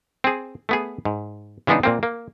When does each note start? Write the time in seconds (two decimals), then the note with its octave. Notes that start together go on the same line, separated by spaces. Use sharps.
0.24 C4 G#4
0.69 A3 B3 G#4
1.05 G#2
1.67 C#3 E3 G#3 B3 D4 D#4
1.83 A#2 A#3 C4
2.03 A#3